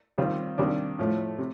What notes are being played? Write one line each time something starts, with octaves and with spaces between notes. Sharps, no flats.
C3 D#3 G3 C4 F4
C3 D#3 G3 A#3 D4
A2 F3 A3
C3